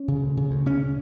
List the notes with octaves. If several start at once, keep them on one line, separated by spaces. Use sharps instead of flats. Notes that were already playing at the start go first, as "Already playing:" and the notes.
Already playing: C#4
C#3
D2
C#3
D2
C#3 C#4